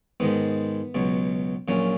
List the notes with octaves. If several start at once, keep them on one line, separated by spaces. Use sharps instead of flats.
G#2 D#3 G#3 B3
C#2 B2 F#3
A#1 A#2 F#3 C#4